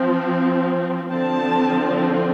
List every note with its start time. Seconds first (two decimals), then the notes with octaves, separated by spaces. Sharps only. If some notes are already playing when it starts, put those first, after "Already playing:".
Already playing: F3 C4
1.12 D3 F3 C4 A5